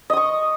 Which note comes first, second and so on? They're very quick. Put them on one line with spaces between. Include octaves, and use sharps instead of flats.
D#5 D#6 C#6